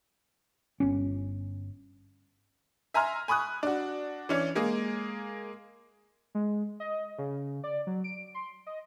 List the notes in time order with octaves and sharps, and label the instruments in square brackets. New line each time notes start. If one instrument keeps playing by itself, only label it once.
[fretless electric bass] G1 C#4
[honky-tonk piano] E5 G#5 A#5 C6 F6
G#5 B5 C#6 D#6 F#6
D4 F#4
E3 C#4 D4
G#3 A#3 G#4
[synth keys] G#3
D#5
C#3
D5
F#3
D7
C6
D#5